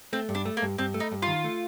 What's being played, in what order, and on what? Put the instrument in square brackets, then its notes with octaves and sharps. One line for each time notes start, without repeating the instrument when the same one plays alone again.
[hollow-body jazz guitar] A3 [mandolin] C4
[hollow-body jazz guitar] G2
[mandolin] D4
[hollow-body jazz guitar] A3
[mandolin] A#3
[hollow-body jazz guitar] G2
[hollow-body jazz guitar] G2 [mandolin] C4
[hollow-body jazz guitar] A3
[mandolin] D#4
[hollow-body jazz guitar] G2
[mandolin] F4
[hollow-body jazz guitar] D#3
A3